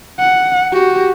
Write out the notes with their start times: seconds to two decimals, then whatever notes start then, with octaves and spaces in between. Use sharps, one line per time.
0.19 F#5
0.72 F#4 G4